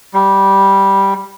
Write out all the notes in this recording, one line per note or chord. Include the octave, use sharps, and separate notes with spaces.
G3